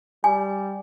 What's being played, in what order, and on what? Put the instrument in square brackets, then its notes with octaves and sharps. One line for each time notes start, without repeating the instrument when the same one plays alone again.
[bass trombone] G3 [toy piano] G#5